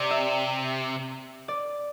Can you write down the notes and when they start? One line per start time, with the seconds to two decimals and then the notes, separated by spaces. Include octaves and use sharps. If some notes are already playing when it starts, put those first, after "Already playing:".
Already playing: C3 D5
0.11 E5
1.48 D5